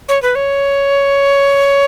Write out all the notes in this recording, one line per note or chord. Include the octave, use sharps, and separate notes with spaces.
C#5
B4
C#5